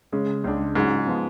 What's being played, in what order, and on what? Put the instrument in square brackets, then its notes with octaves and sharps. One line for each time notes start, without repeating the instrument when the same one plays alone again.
[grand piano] C#3 G#3 C#4
C#2 C#3 G#3 D4
[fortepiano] G#2 [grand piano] C#3 F#3 C#4 F4
[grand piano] F3 B3 F4